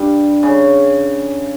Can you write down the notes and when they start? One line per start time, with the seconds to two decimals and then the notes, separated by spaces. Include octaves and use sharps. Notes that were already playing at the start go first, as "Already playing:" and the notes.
Already playing: G2 G3
0.43 C#3